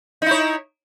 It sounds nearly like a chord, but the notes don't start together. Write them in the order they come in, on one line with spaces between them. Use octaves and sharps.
D#4 E4 C#5